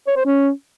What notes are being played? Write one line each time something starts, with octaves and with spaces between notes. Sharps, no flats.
C#5
C5
C#4